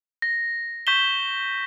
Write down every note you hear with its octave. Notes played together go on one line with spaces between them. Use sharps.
A#6
C#6 G6 B6 E7 G7